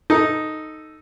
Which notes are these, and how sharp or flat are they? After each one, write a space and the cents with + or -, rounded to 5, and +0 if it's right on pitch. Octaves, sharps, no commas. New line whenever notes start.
D#4 +0 A4 +0